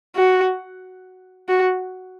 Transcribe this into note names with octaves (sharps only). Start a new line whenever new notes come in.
F#4
F#4